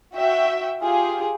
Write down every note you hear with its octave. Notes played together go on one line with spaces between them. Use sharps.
F#4 E5 G5
F4 G4 G#4